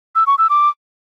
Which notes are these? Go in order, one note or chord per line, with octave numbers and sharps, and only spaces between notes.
E6
C#6
E6
D6